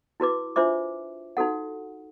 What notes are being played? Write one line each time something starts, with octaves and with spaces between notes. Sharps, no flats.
E4 F#4 B4 D6
D4 F4 C5 E5 D6
D#4 F#4 A4 F#5